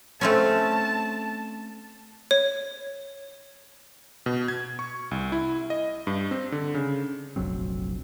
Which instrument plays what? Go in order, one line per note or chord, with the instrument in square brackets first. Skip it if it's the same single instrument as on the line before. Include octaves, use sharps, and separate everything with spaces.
[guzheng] A3 C4 C#4 [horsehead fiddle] A5
[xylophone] C#5
[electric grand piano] B2
G#6
C#6
C2
E4
D#5
G2
C4
D3
C#3
[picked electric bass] F1 A#1 F#3 C4